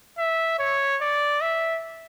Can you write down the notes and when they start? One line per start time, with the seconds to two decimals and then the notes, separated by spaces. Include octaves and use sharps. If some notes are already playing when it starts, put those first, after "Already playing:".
0.18 E5
0.59 C#5
1.01 D5
1.41 E5